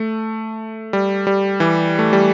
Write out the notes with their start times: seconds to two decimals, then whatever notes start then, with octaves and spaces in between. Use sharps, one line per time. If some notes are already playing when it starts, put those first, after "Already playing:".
Already playing: A3
0.93 G3
1.27 G3
1.60 E3
1.99 A3
2.13 G3